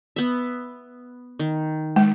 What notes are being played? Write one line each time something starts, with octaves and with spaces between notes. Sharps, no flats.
B3 E5
D#3
G#3